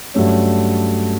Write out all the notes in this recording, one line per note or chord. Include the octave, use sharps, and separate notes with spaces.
G2 F#3 A3 C#4